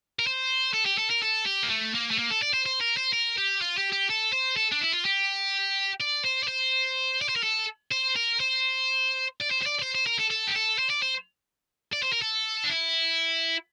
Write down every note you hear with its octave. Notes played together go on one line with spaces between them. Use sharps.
A#4
C5
A4
G4
A4
A#4
A4
G4
A#3
A3
A#3
A3
A#3
A4
D5
C5
C5
A#4
C5
A#4
G4
F4
G4
G4
A4
C5
A4
D4
E4
F4
G4
D5
C5
D5
C5
D5
C5
A#4
A4
C5
A#4
C5
D5
C5
C5
D5
D5
C5
C5
A#4
A4
A4
G4
A4
C5
D5
C5
D5
C5
A#4
A4
D4
E4